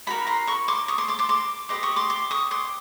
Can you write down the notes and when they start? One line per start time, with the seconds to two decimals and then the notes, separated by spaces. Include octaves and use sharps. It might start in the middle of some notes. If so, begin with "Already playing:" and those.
0.07 D#4 F#4 A#4 B5
0.27 A#5 C6
0.47 B5 C#6
0.68 C6 D6
0.88 C#6 D#6
0.98 C6 D6
1.08 C6 D6
1.19 C6 D6
1.29 C6 D6
1.69 G4 B4 D#5 C6 D6
1.83 C#6 D#6
1.96 C6 D6
2.10 C6 D6
2.31 C#6 D#6
2.51 C6 D6